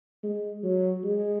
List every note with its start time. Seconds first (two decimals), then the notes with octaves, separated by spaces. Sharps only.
0.23 G#3
0.64 F#3
1.04 G#3